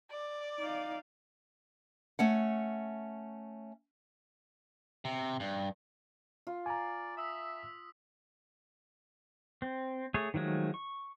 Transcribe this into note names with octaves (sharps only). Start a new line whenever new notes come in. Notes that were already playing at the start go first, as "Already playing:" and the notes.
D5
D#4 F5
A3 C#4 F#5
C3
G2
F4
D5 G#5 A#5
E5 D#6 E6 B6
C4
A3 G#4 C#5
D#3 F3 F#3 G#3 A3
C#6